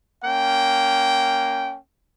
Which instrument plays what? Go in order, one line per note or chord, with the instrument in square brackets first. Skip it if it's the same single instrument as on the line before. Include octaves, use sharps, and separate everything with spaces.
[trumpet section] A#3 C#4 G5